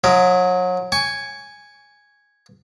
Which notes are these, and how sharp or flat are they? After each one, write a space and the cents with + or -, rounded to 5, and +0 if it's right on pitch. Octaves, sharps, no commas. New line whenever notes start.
F#3 -30 E4 +20 D#5 +0
G#5 -5 C#6 +20